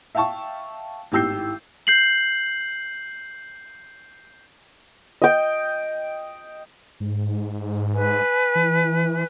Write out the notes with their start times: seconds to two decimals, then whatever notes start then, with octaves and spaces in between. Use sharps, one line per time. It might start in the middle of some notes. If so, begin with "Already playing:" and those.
0.15 E5 F5 G5 A5 C#6
1.12 G#1 A2 G4 E6 G6 C7
1.87 G6 C7 F#7
5.22 D#5 G5
7.00 G#2
7.93 B4 G#5
8.55 E3